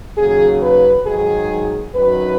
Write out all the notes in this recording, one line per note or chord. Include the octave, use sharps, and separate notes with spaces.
D#2 C#3 F#3 G#4
B4
G#2 D#3 F#3 G#4
F#2 D#3 F#3 B4